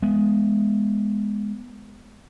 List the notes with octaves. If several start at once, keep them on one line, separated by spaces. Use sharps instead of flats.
G#3 B3